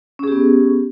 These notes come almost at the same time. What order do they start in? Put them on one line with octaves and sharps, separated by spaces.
C#4 G#4 G4 B3